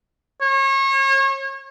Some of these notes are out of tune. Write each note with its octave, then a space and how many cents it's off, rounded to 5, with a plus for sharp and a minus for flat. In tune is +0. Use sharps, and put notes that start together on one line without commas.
C#5 -35